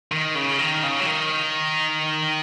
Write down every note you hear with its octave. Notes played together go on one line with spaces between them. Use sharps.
D#3
C#3
D#3
C#3
F#3
D#3